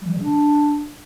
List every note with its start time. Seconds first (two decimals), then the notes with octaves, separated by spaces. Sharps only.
0.01 G3
0.07 E3
0.12 G3
0.18 C#3
0.23 D4